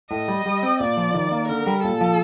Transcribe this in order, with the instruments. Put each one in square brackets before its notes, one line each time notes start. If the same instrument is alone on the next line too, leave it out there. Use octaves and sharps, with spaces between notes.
[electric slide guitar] A2 [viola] D#5
[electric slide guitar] G3
G3
C4
[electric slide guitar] A#2 [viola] D5
[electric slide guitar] F3
D#3
A#3
[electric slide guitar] D3 [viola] A#4
[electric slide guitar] G3
[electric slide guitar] A#2 [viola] A4
[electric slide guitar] F3